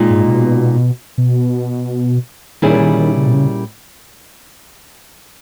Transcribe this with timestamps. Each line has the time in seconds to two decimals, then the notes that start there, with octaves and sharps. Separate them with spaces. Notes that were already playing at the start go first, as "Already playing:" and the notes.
Already playing: A#2 G#3 D#4
0.10 G#2
0.28 B2
1.18 B2
2.62 A#2 D#3 G3 C#4 E4 G#4
2.80 D#3
2.98 D#3
3.16 C#3
3.27 B2
3.34 C#3